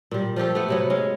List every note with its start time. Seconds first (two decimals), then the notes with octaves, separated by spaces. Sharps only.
0.11 A#2 G3
0.36 F3 A3 G4 A4
0.55 A3 B3
0.68 C3 F#3 B3
0.90 G#3 C#4